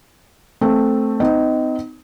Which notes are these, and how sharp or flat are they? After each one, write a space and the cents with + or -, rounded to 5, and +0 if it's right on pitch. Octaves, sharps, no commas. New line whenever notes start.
A3 +0 C4 +0
C4 -40 D#4 +0